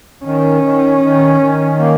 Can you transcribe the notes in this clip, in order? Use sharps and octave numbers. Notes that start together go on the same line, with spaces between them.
D#3 C#4
D#3
D#3
D#3
A#3